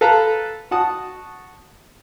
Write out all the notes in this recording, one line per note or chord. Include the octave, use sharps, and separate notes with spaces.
A4 B4 F5 A5 A#5
F#4 F#5 A5 D#6